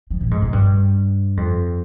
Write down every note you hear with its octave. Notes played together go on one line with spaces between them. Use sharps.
F3
A#2
G#2
G#2
G2
F2